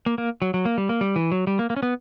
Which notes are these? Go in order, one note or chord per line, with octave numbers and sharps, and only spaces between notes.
A#3
A#3
F#3
F#3
A#3
G3
A#3
G3
E3
F#3
G3
A#3
A#3
C#4
B3